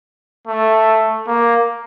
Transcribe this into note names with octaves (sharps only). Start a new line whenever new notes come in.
A3
A#3